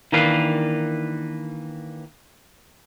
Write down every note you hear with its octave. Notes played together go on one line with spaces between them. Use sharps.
D#3 E3 A#3 D4 B4 F5